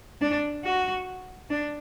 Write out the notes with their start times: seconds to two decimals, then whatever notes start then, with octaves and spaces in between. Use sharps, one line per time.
0.21 D4
0.65 F#4
1.50 D4